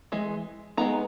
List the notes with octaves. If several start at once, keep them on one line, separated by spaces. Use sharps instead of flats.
E3 G#3
G#3 B3 D#4 A#5